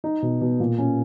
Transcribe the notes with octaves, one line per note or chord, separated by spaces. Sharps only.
D#4
B2
B2
A#2
C#4